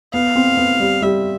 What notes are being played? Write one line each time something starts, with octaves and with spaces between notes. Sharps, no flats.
B3 F5
C4
B3
G3
G3 E5